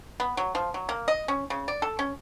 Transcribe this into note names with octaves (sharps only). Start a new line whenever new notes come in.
B3
F#3
F3
F#3
A#3
D#5
C#4
C#3
D5
A4
C#4